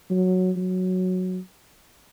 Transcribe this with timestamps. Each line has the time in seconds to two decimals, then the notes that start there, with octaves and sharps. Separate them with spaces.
0.11 F#3
0.57 F#3